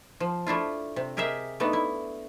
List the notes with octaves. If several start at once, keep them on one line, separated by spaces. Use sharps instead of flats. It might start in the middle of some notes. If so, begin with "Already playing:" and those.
F3
A3 D4 E4 F4
C3
G4 G#4 A#4 D#5 E5
A3 B3 D4 D#4
E4